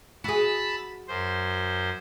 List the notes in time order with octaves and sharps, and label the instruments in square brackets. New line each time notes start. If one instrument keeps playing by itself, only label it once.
[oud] F#4 G#4 [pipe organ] A5 B5 E6
[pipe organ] F#2 C5